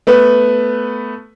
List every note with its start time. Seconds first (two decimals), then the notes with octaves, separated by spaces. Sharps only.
0.07 A3 B3 B4